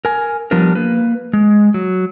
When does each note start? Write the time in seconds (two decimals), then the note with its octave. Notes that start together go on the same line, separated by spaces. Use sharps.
0.05 A#4 G#5
0.51 F3 G3 B3 D4 A#4
0.75 A#3 B4
1.33 G#3
1.74 F#3